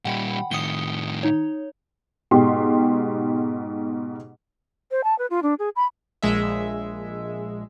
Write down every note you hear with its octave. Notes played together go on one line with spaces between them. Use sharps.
A#2 G3 F#5 G5 B5
A2 D#3 D#6 C#7 G7
D#4 C#5
G#2 B2 G4 C6
C5
A5
B4
F4
D4
G#4
B5
A#1 G#3 E5